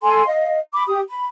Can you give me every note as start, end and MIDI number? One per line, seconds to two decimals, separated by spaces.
0.03 0.25 69
0.03 0.25 80
0.03 0.25 84
0.27 0.59 75
0.27 0.59 77
0.74 0.84 83
0.74 0.84 86
0.87 1.01 67
0.87 1.01 87
1.09 1.28 83